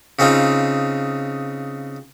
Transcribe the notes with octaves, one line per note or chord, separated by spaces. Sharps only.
C#3 C4 D#4 F4